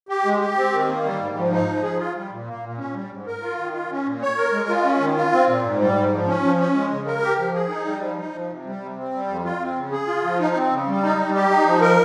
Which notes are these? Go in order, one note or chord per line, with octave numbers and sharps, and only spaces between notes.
G4
G#3
G4
C4
D#3
A#3
G3
G#2
F3
D#4
F3
G#4
F4
G3
A#2
A#3
A#2
C#4
G3
G#2
A#4
F4
D#3
F4
C#4
A#2
C#5
A#4
G#3
F4
C#4
D#3
F4
C4
A#2
G#2
G3
G#2
F3
C#4
F3
C#4
G#3
C#3
A#4
G4
F3
G#4
D#4
G3
F3
D#4
F3
C3
G3
C3
C4
G3
F2
F4
C4
C#3
G#4
F4
F3
D#4
C4
C#3
G3
D#4
G3
G4
D#4
F3
A#4